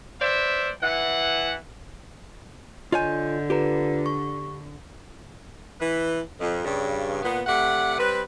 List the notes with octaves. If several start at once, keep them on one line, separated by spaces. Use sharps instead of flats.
B4 C5 D5 E5
E3 F#5
D3 F4 C#5 D#5 G#5 G6
F4 G4 B4 A#5
C#6
E3 B4
F2
G2 C#3
A#2 B3
C3 A3 D5 F#5
G3 C4 B4